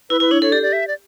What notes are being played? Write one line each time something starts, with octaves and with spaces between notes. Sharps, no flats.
E4 B4
E4 B4
D4 C#5
A4 C#5
G4 D5
D5
E5
D5